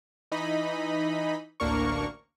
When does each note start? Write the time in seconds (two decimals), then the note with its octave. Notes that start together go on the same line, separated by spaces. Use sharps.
0.32 E3 D#4 D#5 B5
1.60 A1 D2 A#3 D4 A#4 C#6